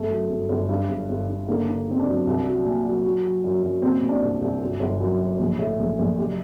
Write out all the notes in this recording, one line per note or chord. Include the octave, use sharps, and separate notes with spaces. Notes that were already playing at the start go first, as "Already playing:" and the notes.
Already playing: G1 A3
F#2
G1
G1
G2
G1
G1
G2
D3 A#3
D3
D3 C4
D4
F#2
C2
F#3
A#2
F#3
F#3
F#3
F#2
F#2
A#2 C4
A#2
D4
C2
C2
G1 F#4
G1
F#2
F#3
A#1
A2
A#1
A#1
F#1 G4